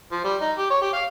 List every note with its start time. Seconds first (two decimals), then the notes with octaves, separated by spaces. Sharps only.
0.12 F3
0.24 G3
0.41 D#4
0.58 G4
0.70 C#5
0.81 G4
0.93 F5